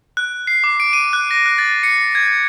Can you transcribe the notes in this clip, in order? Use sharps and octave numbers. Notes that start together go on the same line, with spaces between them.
F#6
C7
D6
D7
D#7
F#6
A#6
F#6
A6
C#7
G#6